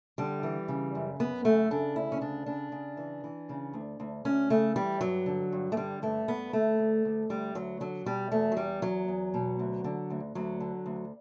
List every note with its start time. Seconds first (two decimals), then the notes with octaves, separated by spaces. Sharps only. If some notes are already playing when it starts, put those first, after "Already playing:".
0.18 D3 G3
0.43 E3
0.68 C#3
0.95 F#2
1.19 F#2 B3
1.45 C#3 A3
1.70 C#3 D4
1.96 D2 E4
2.12 C#4
2.21 C#3 D4
2.46 C#3 D4
2.72 C#3
2.97 E3
3.24 E3
3.49 C#3
3.73 D2
4.00 D2
4.25 D2 C#4
4.50 C#3 A3
4.76 E3 G3
5.01 G2 F#3
5.26 D3
5.52 G2
5.72 A3
5.77 D3 G3
6.02 G2 A3
6.28 G2 B3
6.53 D2 A3
6.79 D2
7.05 D2
7.30 D2 G3
7.55 D2 F#3
7.80 D3 F#3
8.05 B2 G3
8.31 E2 A3
8.52 F#3
8.57 E2 G3
8.82 E2 F#3
9.08 E2
9.34 B2
9.59 D2
9.84 D3
10.10 D2
10.35 D2 F#3
10.60 D3
10.86 D2